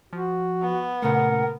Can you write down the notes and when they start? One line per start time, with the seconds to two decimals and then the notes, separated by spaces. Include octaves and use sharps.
0.13 F3 F#4
0.62 B3
1.02 A#2 C#3 A3 A#4 F#5